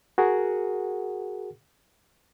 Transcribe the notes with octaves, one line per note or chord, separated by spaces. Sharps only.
F#4 G#4 A#4 F#5